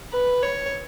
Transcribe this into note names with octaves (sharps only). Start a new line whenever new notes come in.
B4
C#5